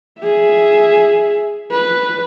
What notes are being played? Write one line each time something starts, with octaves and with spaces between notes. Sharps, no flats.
G#4 E5
B4